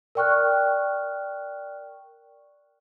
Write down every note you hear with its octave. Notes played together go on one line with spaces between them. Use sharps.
A#4 D5 G5 C#6 F6 F#6